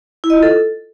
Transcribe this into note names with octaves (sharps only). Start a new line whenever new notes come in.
E4
D#5
F4
A4